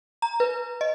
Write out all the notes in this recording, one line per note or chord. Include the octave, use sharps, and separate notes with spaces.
A#5
B4
D#5